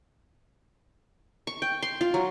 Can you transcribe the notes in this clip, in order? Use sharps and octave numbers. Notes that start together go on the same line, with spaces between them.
C#6
G5
C6
F4
F#3